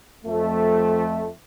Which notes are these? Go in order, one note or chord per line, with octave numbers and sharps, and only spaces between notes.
F2 A3